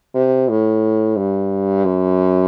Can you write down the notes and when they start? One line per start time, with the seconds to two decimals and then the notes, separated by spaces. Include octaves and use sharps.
0.15 C3
0.49 A2
1.17 G2
1.85 F#2